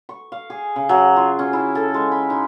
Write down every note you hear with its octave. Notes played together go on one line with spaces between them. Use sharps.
C#6
F5
G#4
C#3
F#3
F4
C#4
E4
A4
G#3
B5
D#4